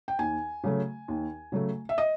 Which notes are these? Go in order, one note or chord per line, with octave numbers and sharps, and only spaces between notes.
G5
D#2 G#5
C#3 F#3 A3
D#2
C#3 F#3 A3
E5
D#5